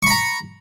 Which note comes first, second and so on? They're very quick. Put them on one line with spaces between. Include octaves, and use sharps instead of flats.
C#6 B5 A#5